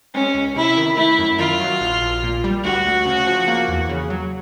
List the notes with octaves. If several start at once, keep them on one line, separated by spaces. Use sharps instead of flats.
G#3 C#4
C#2
C3 E4
D#3
A3 E4
F#2
D#3 F4
F#3
A#1
A#1
A#2
G3
D2 F#4
D2
C#3
F3
A#3
E2
C#3
F#3